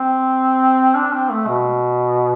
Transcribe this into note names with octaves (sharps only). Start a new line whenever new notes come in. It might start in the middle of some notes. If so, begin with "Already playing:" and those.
Already playing: C4
D4
C4
A3
B2